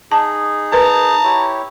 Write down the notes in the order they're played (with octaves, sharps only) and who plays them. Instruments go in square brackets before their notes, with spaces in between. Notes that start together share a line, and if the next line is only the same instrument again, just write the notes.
[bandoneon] D#4 G#4 [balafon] A5
[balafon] A#4 B4 [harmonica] A5 A#5
[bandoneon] E4 G4 C#5